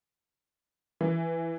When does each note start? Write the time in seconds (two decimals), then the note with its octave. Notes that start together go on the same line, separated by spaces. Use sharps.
1.01 E3